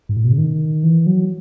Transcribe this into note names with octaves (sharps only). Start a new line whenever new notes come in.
G#2
A2
B2
C#3
D#3
E3
F#3